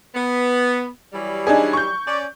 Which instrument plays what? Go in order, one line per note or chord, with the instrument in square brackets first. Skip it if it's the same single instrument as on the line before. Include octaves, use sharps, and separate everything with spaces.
[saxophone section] B3
E3 F#3 G3
[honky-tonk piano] D4 D#4 G#4
C#6 G6
[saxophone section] C#4 D5